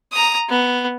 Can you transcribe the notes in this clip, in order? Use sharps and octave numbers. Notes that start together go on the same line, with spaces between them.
A#5 D#6
B3